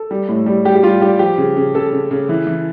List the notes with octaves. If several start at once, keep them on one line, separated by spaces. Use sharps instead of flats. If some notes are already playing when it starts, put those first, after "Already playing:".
Already playing: A4
G3
A2
G3
G3 G4
G4
G3 F4
G3 G4
F3 G4
C#3
C#3
C#3 A4
C#3
C#3
E3
E3